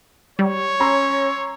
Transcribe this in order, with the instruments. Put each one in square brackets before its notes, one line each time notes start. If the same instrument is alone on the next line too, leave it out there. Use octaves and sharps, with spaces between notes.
[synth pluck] G3 [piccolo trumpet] C#5
[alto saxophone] C#4 [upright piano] A#5 C6 E6